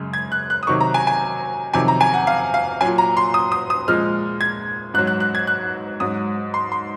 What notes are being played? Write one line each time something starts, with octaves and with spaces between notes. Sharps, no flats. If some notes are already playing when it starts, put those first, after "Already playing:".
Already playing: F#2 C#3 G#3
G#6
F#6
F#6
D#6
C3 D#3 F#3 C#6
A#5
G#5
G#5
F2 C3 D#3 F#3 G#5
A#5
G#5
F#5
F5
F5
A#2 F#3 G#5
A#5
C6
D#6
D#6
D#6
A#2 F3 G#3 F6
G#6
G#2 F#3 F#6
F#6
F#6
G#6
F#6
G#2 F#3 D#6
C6
C6